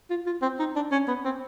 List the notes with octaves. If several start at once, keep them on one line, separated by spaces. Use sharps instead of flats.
F4
F4
C4
D#4
D4
C#4
B3
C4